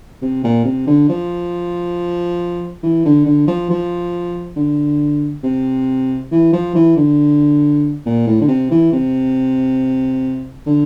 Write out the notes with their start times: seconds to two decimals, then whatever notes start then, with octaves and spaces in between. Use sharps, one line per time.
0.22 C3
0.44 A#2
0.65 C3
0.87 D3
1.09 F3
2.83 E3
3.05 D3
3.26 D3
3.47 F3
3.70 F3
4.56 D3
5.43 C3
6.31 E3
6.53 F3
6.75 E3
6.97 D3
8.06 A#2
8.27 A2
8.41 D3
8.48 C3
8.70 E3
8.92 C3
10.67 D3